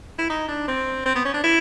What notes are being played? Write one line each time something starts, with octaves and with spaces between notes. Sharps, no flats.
E4
D#4
D4
C4
C4
B3
C#4
D4
E4